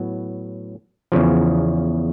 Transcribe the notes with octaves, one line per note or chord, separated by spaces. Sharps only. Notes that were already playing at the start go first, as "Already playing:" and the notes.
Already playing: A2 F#3 B3
E2 C#3 F3